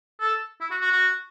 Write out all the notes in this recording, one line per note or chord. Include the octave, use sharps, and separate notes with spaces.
A4
E4
F#4
F#4
F#4